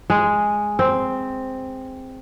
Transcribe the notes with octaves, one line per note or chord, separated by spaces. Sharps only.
G#3
C4